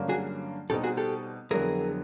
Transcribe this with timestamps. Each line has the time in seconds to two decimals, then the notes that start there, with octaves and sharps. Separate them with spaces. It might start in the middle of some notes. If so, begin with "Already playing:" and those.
Already playing: G2 D3 F#3 A#3 C#4
0.09 F#4 G#4
0.70 B2 G3 C4 D#4 G4 A4
0.83 F#4 G#4
0.97 G4 A4
1.50 F2 D3 F#3 B3 E4 G#4 A#4